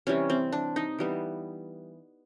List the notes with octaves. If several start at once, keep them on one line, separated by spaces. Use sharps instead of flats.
C3 E3 G3 C#4
C4
D4
D#4
E3 G3 B3